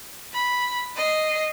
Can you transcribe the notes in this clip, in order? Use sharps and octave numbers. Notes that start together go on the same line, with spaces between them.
B5
D#5 C7